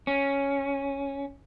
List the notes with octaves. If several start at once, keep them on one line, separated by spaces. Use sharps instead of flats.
C#4